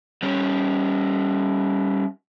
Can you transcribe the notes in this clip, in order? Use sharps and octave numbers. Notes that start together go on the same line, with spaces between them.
G3 C#4